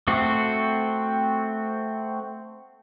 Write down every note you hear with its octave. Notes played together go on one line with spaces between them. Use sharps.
A3 C4 F#4